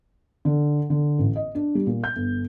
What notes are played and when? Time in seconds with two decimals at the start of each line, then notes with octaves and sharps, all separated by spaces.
0.45 D3
0.90 D3
1.19 A1
1.36 D#5
1.55 D4
1.75 G3
1.87 A#2
2.04 G6
2.16 G1